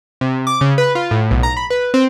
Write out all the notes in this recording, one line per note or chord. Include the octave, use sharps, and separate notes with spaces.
C3
D6
C#3
B4
F4
A2
B1
A#5
B5
B4
C4